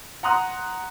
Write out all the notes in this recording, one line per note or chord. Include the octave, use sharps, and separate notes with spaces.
F#5 A#5 C6 D#6 F#6